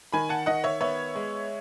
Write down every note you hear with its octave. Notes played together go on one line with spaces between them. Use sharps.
D#3 G#5 B5
F#5 A5
D#3 D#5 F#5
C#5 E5
B3 C#5 E5
G#3